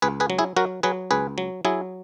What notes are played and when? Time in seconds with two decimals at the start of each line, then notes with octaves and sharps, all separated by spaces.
0.02 C#2 G#4 B4
0.20 G#4 B4
0.30 F#3
0.39 E4 G#4
0.56 F#3 F#4 A#4
0.83 F#3 G#4 B4
1.11 C#2 G#4 B4
1.38 F#3
1.65 F#3 E4 G#4